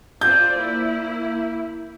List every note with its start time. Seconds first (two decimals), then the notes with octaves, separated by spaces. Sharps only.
0.21 F4 C5 D5 G6
0.56 A#3 E4